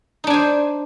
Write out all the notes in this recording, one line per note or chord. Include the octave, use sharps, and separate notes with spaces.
D4 D#4 C5 G#5